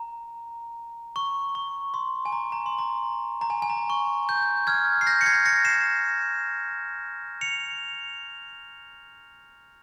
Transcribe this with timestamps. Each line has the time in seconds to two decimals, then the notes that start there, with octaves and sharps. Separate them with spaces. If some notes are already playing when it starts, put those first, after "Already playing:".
Already playing: A#5
1.16 C#6
1.55 C#6
1.94 C6
2.25 G#5
2.32 A#5
2.52 A#5
2.66 C6
2.78 A#5
3.41 A#5
3.50 G#5
3.62 G#5
3.70 A#5
3.90 C#6
4.29 G6
4.67 F6 G#6
5.01 C7
5.07 G6 A#6
5.21 C#7
5.26 G#6 C7
5.45 A#6 C#7
5.65 C7 E7
7.41 C#7 F7